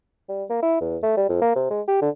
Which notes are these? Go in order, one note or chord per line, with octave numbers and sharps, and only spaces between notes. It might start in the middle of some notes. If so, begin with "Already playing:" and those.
G3
A#3
E4
E2
A3
G3
F2
A#3
C3
G#3
G4
D3